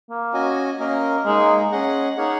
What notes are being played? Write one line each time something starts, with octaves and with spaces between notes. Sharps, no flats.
A#3
C#4 F#4 D#5 G#5
A#3 C#4 A#4 D#5
G#3 A#3 D#4 G#4
C#4 G#4 D#5 F#5
A#3 D#4 G#4 C#5 F#5